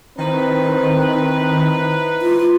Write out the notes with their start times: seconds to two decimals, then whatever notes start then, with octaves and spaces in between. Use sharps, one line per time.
0.18 D#3 C4 D#4 E4 B4
2.22 F4